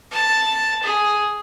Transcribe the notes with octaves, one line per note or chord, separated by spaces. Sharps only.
A5
G#4